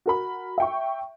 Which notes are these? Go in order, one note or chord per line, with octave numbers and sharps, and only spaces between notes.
F#4 A#4 B5
E5 G5 C#6